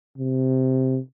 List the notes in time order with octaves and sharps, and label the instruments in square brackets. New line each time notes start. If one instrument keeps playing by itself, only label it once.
[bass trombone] C3